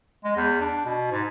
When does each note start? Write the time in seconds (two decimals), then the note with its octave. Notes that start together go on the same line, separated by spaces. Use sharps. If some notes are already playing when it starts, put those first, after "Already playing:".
0.24 G#3
0.36 E2
0.61 D4
0.86 B2
1.11 G#2